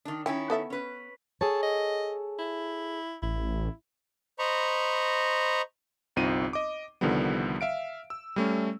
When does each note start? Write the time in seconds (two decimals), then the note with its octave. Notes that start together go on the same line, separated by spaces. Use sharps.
0.05 D#3 D4
0.26 D#3 C#4 E4 G5
0.50 B3 A4 E5
0.70 C#4 B4
1.41 G#4 A4 C#5 A5
1.63 D#5
2.39 E4
3.22 A1 E4
4.39 C5 D#5 A#5 B5 C#6
6.16 G1 C2 C4 D#4 F4 D#7
6.53 D#5 D6
7.01 C2 D3 D#3 F3 G3 B3
7.61 E5 F5 D7
8.10 E6
8.36 G3 A3 C#4